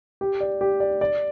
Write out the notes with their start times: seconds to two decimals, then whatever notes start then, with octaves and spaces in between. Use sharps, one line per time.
0.21 G4
0.40 D5
0.61 G4
0.80 D5
1.01 D5